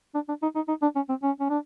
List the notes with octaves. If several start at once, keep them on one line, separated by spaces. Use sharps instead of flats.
D4
D4
D#4
D#4
D#4
D4
C#4
C4
C#4
C#4
D4